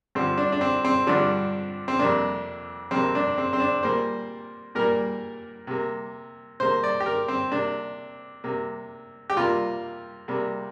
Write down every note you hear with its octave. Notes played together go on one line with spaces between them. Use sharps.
G2 D3 F3 C4
D4
D4
C4
C4
G2 D3 F3 D4
C4
F2 C3 A#3 D4
F2 C3 A#3 C4
D4
C4
C4
D4
A#2 G3 A#3 C5
A#2 G3 A#3 A#4
C3 A#3
C3 A#3 C5
D5
G4
A#4
C4
C3 A#3 D4
C3 A#3
G4
C3 G3 A#3 F4
C3 G3 A#3